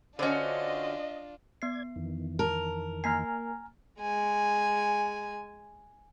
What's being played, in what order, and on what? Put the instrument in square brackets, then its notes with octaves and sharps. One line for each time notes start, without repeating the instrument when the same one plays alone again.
[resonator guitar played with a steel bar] D3 C#4 [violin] D4 F4 [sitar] F#4 C5 D5 [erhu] D#5
[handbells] B3 C7 [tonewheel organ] D5 G#6
[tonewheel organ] F2 D#3 E3
[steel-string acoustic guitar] A#4 [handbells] A5
[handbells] A#3 C7 [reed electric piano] G#5 A#5 F6
[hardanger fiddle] G#3 G#5